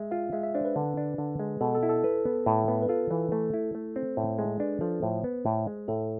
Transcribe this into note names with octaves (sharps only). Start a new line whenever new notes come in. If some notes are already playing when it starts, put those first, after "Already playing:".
Already playing: G#3 E5
F4 F5
G#3 E5
E5
D4 C5
B4
D3
D4
D3
G#3
B2 A4
A4
E4
A4
B4
B3
A2
B3
B4
F4 A4
E3
A3
E4
A3
C4
A2
G#3
D4 B4
F3 A4
A2 C5
B3
A2
G#3
A2 A4